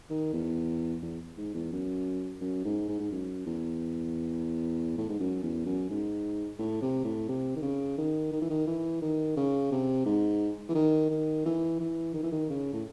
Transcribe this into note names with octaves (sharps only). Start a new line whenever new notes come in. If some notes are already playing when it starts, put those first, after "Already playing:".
D#3
E2
E2
G#2
E2
F#2
F#2
G#2
G#2
G#2
F#2
E2
A2
G#2
F#2
E2
F#2
G#2
A2
C3
A2
C3
D#3
C#3
D#3
D#3
E3
D#3
E3
D#3
C#3
C3
G#2
E3
D#3
D#3
E3
E3
D#3
E3
D#3
C#3
A2